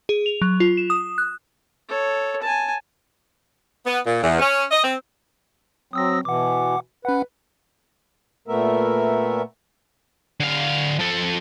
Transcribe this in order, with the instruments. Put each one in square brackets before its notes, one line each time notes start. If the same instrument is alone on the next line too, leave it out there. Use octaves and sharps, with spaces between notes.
[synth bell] G#4
F7
F#3
F4
E7
D#6
F#6
[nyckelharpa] A4 C#5
G#5 A5
[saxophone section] B3
A#2
E2
C#4
D#5
C4
[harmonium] F#3 C4 [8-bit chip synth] D#6 E6 A#6
[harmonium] B2 E3 [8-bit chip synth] F#5 D6
[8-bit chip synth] C#4 F#5 [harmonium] B4
[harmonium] A#2 A3 B3 A#4 E5
[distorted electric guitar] D3 F5
F3 A4